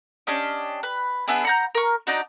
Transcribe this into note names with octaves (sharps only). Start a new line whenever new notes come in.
C#4 D4 G4 D#5
B4
B3 D4 E4 G#4
F#5 A#5 G6
A#4 C#6
D4 D#4 F#4